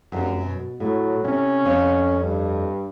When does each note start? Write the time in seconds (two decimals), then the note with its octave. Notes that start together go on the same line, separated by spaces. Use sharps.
0.12 F1 F#2
0.41 B2
0.80 A2 F#3
1.25 C3 C#4
1.65 F2 C#5
2.21 G2